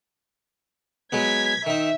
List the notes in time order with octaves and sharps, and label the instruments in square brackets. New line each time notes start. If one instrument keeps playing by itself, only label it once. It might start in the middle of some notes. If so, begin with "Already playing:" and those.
[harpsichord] F#3 G#3 B3 [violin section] G#6 B6
[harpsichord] D#3 D#4 [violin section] E5